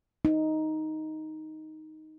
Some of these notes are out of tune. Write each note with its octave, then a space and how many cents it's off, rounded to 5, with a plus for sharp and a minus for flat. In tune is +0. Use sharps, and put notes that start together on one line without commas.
D#4 +5